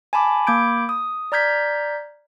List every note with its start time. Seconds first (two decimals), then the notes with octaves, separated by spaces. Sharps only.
0.13 G#5 A5 B5 D6
0.47 A#3 B5 D6 G6 G#6 D7
0.89 D#6
1.32 D5 A#5 F6 G6 G#6 B6